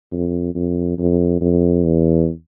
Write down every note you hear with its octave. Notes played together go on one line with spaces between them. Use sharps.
F2
F2
F2
F2
E2